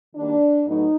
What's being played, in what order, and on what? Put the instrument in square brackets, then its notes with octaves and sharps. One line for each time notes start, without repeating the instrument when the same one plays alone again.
[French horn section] D#3 G3 A#3 D4
A2 F#3 B3 D#4